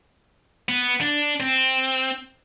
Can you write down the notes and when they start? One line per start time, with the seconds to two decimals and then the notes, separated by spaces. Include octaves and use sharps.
0.69 B3
1.01 D4
1.40 C4